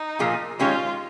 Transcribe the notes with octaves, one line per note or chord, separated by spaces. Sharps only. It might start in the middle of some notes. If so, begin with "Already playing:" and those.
Already playing: D#4
A#2 F3 A#3 F4 G#4
D#3 G#3 C#4 F4 G4 C#5